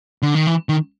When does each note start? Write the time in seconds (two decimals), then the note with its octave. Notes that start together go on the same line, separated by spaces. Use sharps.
0.23 D3
0.35 D#3
0.47 E3
0.69 D#3